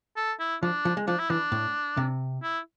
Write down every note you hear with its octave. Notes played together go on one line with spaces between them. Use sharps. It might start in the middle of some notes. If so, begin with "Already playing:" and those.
A4
E4
F3 D4
F3
G#3
F3 D4
E4
E3 D4
A2
C3
E4